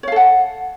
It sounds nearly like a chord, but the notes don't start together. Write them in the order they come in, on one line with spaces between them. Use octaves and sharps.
C#5 F5 A4 F#5